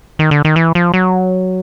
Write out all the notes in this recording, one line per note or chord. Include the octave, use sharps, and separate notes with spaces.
D#3
D3
D#3
E3
F3
F#3